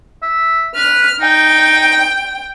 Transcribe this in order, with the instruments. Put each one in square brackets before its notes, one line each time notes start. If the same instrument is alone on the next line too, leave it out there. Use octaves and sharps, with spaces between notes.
[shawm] E5
[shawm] B4 [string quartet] F6
[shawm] D#4 [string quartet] G5